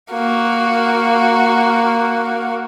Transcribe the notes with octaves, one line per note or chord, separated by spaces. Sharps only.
A#3 F#4